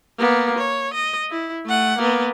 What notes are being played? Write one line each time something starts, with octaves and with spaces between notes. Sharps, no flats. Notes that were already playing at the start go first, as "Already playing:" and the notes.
A#3 B3
C#5
D#5
E4
A3 F#5
A#3 B3